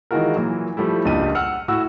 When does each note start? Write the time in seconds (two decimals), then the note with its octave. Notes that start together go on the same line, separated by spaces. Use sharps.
0.11 D#3 E3 G#3 F4 F#4 A#4
0.36 A#2 E3 F#3
0.77 F3 G3 A3 E4
1.05 C#2 G2 A#2 G3 G4 D#7
1.35 F#5 E6 F6 C#7
1.68 A2 E4 F#4 E6